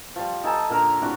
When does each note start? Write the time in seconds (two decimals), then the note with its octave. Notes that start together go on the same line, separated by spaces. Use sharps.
0.16 F3 G3
0.44 D#4 A4 G#5 A5
0.70 A#2 D3 A#4 A#5
1.01 A2 C3 D4 F#4